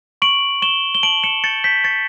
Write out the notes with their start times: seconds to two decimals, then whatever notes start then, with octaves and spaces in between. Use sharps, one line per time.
0.22 C#6 D7 F#7
0.62 C#6 E7 G7
0.95 G7
1.03 A5 D7 F#7
1.24 C#7 E7
1.44 G6 A6 C#7
1.64 G6 B6
1.84 C#6 A6 C#7